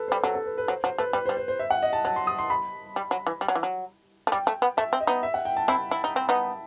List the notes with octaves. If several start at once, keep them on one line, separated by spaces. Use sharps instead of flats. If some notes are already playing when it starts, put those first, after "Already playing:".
Already playing: A4 B4
G3 C5
F#3 A4
A4
B4
B4
F#3 C5
F#3 C5
A3 B4
G3 B4
C5
G3
C5
C5
E5
F#5
D#5
A5
F#3 A5
C6
D#6
C6
B5
G3
F#3
E3
G3
F#3
E3
F#3
A3
G3 G5
A3
B3
A3 E5
C4
D#5
B3 D#4
E5
F#5
G5
A5
C4 E4 B5
E4
D#4
C4
B3 D#4